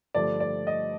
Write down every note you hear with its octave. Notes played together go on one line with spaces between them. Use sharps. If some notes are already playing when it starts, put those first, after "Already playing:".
G2 D3 F3 A3 D5
D5
D#5